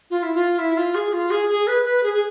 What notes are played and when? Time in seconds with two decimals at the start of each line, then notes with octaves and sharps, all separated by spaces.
0.10 F4
0.23 E4
0.35 F4
0.59 E4
0.77 F4
0.95 G#4
1.13 F4
1.31 G#4
1.49 G#4
1.67 B4
1.85 B4
2.03 G#4
2.13 G#4